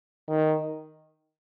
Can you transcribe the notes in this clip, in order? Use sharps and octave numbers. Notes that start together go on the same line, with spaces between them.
D#3